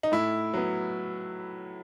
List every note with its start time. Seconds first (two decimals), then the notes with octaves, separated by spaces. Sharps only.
0.03 D#4
0.12 A2 E4
0.54 F#3 B3